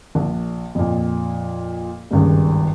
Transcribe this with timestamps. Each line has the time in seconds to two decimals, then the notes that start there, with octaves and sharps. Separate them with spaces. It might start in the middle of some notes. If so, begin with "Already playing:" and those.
0.15 A#1
0.75 F2 A#2
2.11 G#1 C#2 G2